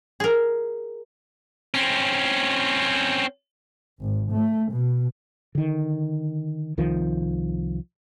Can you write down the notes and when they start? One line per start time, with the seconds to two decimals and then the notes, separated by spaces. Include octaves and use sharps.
0.20 G#4 A#4
1.74 C4 C#4
4.00 G#1
4.31 A3
4.72 B2
5.55 D3 D#3
6.77 C2 D#3 F3